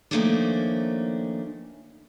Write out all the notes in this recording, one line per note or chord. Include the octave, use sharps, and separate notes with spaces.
D#3 F3 A3 A#3 C#4 D4